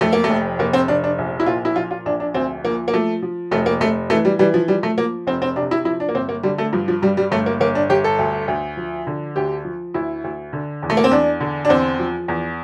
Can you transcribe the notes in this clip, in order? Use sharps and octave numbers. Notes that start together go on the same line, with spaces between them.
F2 A3
A#3
A3
F1
F1 A#3
C4
F1 D4
D4
A#1
E4
A#2 F4
E4
F3 F4
F4
A#1 D4
D4
D2 C4
F3 A#3
A#3
F3 A3
F3
F1 A3
A#3
F1 A3
E3 A3
G3
E3 G3
F3
F3 G3
A3
F3 A#3
F1 C4
C4
C3 D4
E4
F3 E4
D4
A#3
G1 C4
A#3
D3 G3
A3
G2 F3
F3
G2 G3
G3
G1 A3
A#3
G1 A#3
D4
G1 G4
A4
D2
D2
F3
D3
D2 G4
F3
D2 E4
D2
D3
E2
A3
A#3
C4
E2 D4
D3
D4
E2 C4
F3
E2